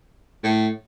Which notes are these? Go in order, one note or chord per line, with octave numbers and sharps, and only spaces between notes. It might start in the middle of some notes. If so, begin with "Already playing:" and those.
A2